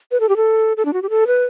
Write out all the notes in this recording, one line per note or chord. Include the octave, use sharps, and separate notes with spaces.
B4
A4
G4
A4
A4
D4
F#4
G4
A4
B4